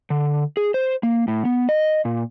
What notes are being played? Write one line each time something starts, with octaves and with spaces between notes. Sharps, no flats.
D3
G#4
C5
A#3
A2
B3
D#5
A#2